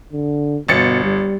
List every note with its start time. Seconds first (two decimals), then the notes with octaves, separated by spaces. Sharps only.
0.13 D3
0.68 G1 B2 A6 C#7
1.04 G3